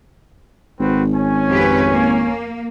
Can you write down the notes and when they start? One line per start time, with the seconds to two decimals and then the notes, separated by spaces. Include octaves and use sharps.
0.79 G#1 C4 F#4 B4
1.14 C#4 C#5 G#5
1.48 F2 G4 B4
1.92 A#3